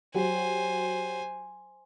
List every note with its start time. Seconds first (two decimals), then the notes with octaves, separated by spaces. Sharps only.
0.15 F#3 F#4 G4 C5 G#5